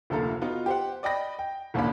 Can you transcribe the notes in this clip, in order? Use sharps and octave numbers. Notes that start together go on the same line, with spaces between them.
F1 D2 F3 A#3 A4 A#5
B3 D#4 F4 F#4
G4 C5 F#5
D5 D#5 G5 B5 A#6
G5
E1 A1 D#2 A#3 D4 B5